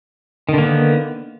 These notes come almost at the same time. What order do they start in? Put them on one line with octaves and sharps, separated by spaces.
D#3 D3 A#3 B3